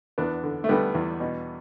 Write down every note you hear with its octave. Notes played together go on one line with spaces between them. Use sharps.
E2 B3 D4
D3
A3
D3 G3 B3
E2
B2